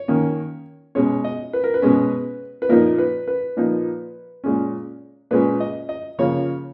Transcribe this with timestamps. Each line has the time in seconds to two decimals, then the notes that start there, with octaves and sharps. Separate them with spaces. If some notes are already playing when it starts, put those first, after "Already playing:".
Already playing: C#5
0.08 D#3 A#3 C#4
0.95 B2 G#3 C#4 C#5
1.24 D#5
1.53 B4
1.64 A#4
1.74 B4
1.82 B2 G#3 C#4
2.62 B4
2.69 A#2 F3 A#3 D#4 A#4
2.98 B4
3.28 B4
3.57 A#2 F3 A#3 D#4
4.44 A#2 G#3 C#4
5.31 A#2 G#3 C#4 B4
5.60 D#5
5.89 D#5
6.19 C#3 F3 A#3 C#5